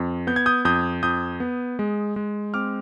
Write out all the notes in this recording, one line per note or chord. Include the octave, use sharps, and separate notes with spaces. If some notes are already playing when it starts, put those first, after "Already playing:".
Already playing: F2
B3 G6
G#6
D#6 G6
F2 D#6 G6
F2 D#6 G6
B3
G#3
G#3
C4 D6 F6